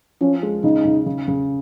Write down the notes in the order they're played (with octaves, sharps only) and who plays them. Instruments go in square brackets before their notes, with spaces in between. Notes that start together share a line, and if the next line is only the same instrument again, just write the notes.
[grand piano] F3 [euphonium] C#4
[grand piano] G#3
[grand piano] C#3 [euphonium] D#4
[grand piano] C#3
C#3
C#3